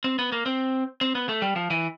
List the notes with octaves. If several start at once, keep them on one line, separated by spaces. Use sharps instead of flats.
C4
B3
A#3
C4
C4
B3
A3
G3
F3
E3